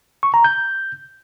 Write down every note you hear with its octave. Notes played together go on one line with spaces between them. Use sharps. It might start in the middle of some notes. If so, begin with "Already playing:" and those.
C#6
A#5
G6